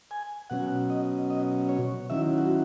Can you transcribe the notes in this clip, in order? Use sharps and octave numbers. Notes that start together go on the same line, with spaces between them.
G#5
B2 F#3 C#4 F#5
D#5
D#5
C#5
D#3 F#3 C#4 E4 E5
F#4